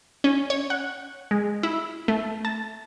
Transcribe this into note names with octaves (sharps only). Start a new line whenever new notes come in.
C#4
C#5
F#5
G#3
E4
A3
A5